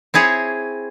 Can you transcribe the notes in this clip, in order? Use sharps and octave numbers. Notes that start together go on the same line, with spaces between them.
C4 E4 G#4 C#5